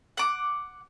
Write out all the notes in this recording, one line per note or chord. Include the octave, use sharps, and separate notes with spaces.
F#5 D6